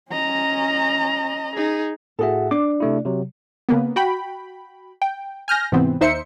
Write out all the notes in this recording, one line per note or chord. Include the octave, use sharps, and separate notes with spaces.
C#4 D#5 A#5
D#4 G#4
A2 F#4 G#4 A4 E5
D4 D6
C3 A3 E4
C3 F#3
C#3 A#3 B3
F#4 G5 B5
G5
G#5 F6 G6 A#6
G#2 C3 E3 B3 C4
D#2 D#4 C5 E5 C#7